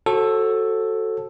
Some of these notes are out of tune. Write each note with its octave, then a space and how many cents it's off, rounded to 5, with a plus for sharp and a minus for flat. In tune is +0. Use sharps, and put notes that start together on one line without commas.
F#4 +5 A4 +0 C5 +45